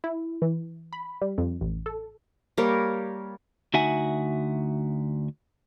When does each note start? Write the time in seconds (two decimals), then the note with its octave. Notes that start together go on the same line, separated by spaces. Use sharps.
0.04 E4
0.42 E3
0.93 B5
1.22 G3
1.38 F2
1.61 A1
1.86 A4
2.57 G3 A#3 A#4 C#5
3.74 D2 D#4 F#4 E5 F#5 G#5